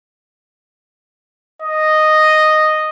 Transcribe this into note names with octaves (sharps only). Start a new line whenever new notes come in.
D#5